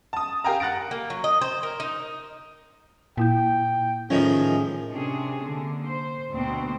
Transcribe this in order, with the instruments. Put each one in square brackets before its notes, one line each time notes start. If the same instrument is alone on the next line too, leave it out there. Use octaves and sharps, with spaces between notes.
[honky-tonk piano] A5 D#6
G4 A#4 F5 G5 G#5 A#5
F#5 F#6 A6 A#6 D7
[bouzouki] A#3
F#3
D#5
C5
A#4
D#4
[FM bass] A#2 [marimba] A#3 E4 G6 [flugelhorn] G5
[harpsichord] A2 D#3 F3 [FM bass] C#4 [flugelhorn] G#4
[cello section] C3 C#4 D4 G#4
D3 A#3
C5
D2 B2 C4 D4